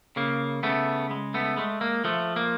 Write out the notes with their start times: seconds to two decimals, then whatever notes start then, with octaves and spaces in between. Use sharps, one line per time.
0.16 C#3 A#3
0.63 C#3 A3 B3
1.11 G#3
1.34 A3 B3
1.57 G#3 A3
1.81 A#3
2.04 F3 A3
2.36 A#3